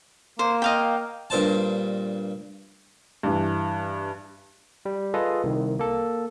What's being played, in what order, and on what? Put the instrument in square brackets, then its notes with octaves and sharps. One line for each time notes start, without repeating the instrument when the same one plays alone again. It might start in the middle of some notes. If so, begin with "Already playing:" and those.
[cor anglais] A#3 [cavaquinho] C5
[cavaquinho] D#5 F5 G5
[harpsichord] G2 A#2 C5 A5
[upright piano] G2 E3
[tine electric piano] G3
F4 G#4 A4 B4 D#5
C2 D#3
A#3 A4